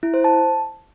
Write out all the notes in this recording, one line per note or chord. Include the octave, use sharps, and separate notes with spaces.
E4
C5
A5